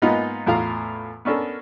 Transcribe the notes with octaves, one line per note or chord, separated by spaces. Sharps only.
G#2 A#3 B3 D#4 F4
E2 A2 F4 F5 A#5
B3 C#4 D4 A4 A#4